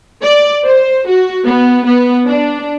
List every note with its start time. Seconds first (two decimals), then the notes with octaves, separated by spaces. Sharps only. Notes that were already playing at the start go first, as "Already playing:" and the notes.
0.22 D5
0.64 C5
1.08 F#4
1.46 B3
1.85 B3
2.27 D4